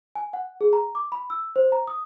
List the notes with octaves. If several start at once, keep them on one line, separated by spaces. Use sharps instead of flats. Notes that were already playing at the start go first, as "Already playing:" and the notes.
G#5
F#5
G#4
A#5
D6
B5
E6
C5
A#5
D#6